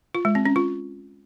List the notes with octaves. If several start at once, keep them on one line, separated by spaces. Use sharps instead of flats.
F4
G#3
C4
C#4
F4